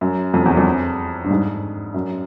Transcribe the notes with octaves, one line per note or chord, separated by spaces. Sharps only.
F#2
F2
E2
F2
G2
G#2
F#2